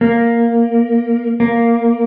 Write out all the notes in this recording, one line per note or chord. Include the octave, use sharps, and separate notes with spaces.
A#3
A#3